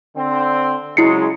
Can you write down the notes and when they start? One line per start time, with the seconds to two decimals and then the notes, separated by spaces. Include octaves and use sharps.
0.17 D3 C4
0.97 C#3 F#3 G#3 E4 C7 C#7